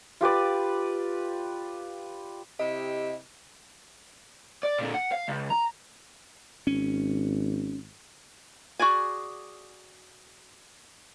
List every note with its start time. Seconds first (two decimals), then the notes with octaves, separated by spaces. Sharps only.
0.21 F4 G4 B4 D5
2.59 C3 E4 G4 D#5
4.63 D5
4.79 A#2 D3
4.94 F#5
5.12 F5
5.28 C#2
5.51 A#5
6.67 G#1 C#4
8.79 F#4 G#4 D5 G#5